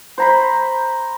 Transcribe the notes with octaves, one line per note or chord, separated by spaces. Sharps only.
C5 A#5 B5